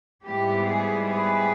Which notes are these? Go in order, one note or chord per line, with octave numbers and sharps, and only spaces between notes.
G#2 G3 B3 E4 G4
G#4
G#4 B4